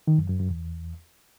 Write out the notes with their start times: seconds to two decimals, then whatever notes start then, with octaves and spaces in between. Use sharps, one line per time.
0.07 D#3
0.18 F#2
0.29 F#2
0.40 F#2
0.51 E2